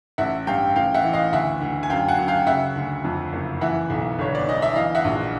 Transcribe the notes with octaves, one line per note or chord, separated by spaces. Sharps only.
A1 E5 F#5
G2 F5 G5
A1 F5 G5
E5 F#5
E3
D#5 F5
D2 E5 F#5
D2
G#5
F#2 F5 G5
F#5 G#5
F#2
F5 G5
C#3 E5 F#5
D2
F2
F#1
E3 E5 F#5
B1
G1 C#5
D5
G1 D#5
E5
E3 D#5 F5
E5 F#5
A#1